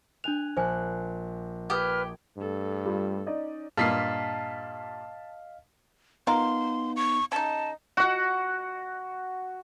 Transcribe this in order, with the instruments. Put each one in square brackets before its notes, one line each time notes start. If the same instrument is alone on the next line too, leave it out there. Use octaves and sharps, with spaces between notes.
[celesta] D4 F7 [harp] G#5 F#6
[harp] A#1 F#6 [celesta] C5 G#5
[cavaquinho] G4 D#6 [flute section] B4 F6 [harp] G#6
[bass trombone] G2 [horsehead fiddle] A3 A4
[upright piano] G3 F4
[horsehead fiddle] C#4 [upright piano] D#4 D5 D#5
[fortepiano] G2 A#2 [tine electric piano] D#5 F5 F6 [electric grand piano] A5 B6 C7
[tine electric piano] B3 D#4 [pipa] F4 A#4 F5 [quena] C6
[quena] C#6
[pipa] C#3 D#4 [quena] A5
[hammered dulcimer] F#4 F#5